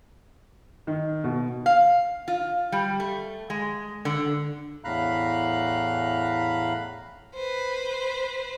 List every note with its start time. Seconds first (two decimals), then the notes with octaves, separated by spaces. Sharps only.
0.87 D#3
1.24 B2
1.66 F5
2.28 F4
2.72 G3
3.00 A3
3.50 G#3
4.05 D3
4.84 E2 A2 F5 A#5 B5 F#6
7.34 B4 C5